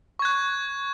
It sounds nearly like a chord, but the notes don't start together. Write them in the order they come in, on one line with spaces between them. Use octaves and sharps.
C#6 G#6 F#6